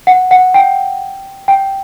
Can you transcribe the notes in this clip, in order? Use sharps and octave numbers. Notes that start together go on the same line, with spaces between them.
F#5
F#5
G5
G5